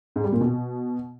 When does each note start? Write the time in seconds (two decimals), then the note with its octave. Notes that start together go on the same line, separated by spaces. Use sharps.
0.16 G#2
0.24 G3
0.32 A#2
0.41 B2